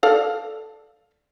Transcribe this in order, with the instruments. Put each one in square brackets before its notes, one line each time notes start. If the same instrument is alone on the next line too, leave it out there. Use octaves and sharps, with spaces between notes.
[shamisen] A4 D5 F5